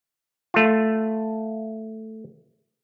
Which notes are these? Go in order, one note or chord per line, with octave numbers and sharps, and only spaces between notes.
A3 F4